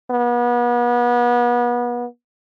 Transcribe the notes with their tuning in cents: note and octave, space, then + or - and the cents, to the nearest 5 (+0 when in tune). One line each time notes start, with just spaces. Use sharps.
B3 -35